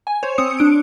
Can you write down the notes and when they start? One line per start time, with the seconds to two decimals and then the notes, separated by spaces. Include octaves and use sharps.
0.07 G#5
0.23 C5 C#5
0.38 C4 D#6 C#7
0.59 D4 D7